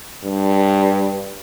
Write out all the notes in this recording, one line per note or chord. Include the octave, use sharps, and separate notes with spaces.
G2